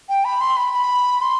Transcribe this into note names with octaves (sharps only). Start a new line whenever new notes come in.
G5
B5
C6
B5
B5
C6